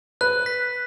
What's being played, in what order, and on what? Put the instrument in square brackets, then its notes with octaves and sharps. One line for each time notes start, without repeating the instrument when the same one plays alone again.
[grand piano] B4 [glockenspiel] F#6
[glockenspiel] B6